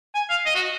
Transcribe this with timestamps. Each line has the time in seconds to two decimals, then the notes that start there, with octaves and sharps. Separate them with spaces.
0.14 G#5
0.30 F5
0.46 D#5
0.55 F#4